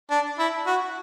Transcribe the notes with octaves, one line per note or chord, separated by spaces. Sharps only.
D4
E4
F#4